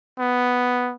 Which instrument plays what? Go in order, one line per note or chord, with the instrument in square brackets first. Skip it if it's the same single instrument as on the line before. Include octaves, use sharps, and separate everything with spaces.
[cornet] B3